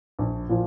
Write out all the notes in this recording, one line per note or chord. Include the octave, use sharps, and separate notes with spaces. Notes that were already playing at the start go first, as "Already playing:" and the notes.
A#1
A#2 F3